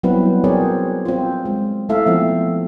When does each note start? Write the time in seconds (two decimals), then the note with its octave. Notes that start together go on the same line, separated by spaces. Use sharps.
0.03 F#3 G3 B3 C4 E4 B4
0.44 C4 F#4 G#4 A#4 C#5 D5
1.05 C4 F4
1.45 G#3
1.89 A3 E4 A4 E5 F5
2.07 F3 A3 B3 C4